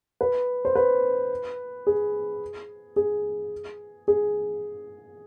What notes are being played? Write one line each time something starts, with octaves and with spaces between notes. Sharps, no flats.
B4
C5
B4
G#4
G#4
G#4